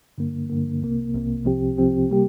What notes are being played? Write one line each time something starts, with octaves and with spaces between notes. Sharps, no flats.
G2 D3 A#3
G2 D3 A#3
C2 C3 A#3
C2 C3 A#3
C2 C3 F3 C4 G4
C2 C3 F3 C4 G4
C3 G3 A#3 G4